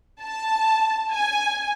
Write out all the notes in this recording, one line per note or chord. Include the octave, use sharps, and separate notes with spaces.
A5
G#5